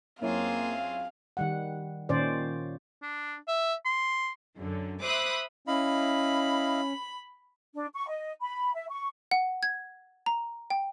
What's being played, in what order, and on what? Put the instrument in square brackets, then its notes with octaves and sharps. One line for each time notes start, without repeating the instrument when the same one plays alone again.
[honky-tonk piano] F#2 C#4 E4 [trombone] A#3 [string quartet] C4 F4 G#4 [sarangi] F5
[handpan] D#3 G3 F#5
A#2 D#3 C#4 C5 D5
[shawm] D4
E5
C6
[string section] F#2 D3
C5 E5 B5 D6 D#6 F#6
[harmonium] C#4 [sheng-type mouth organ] E4 D#5 F5 [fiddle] B5
[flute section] D4
C#6
D#5
B5
E5
C#6
[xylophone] F#5
G#6
A#5
G5